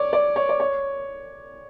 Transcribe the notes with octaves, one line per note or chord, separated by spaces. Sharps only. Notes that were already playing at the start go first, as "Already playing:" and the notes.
Already playing: C#5 D5
D5
C#5
D5
C#5